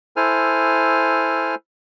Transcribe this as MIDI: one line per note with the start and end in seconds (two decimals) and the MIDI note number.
0.16 1.55 64
0.16 1.55 69
0.16 1.55 72
0.16 1.55 80
0.16 1.55 89